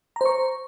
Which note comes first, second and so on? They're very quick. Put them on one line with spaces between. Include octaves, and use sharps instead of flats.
A#5 C5 C#6